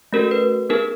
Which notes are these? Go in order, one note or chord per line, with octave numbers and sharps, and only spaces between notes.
A3 C#4 F#4 A4 A#4
B4
B3 D#4 G#4 A#4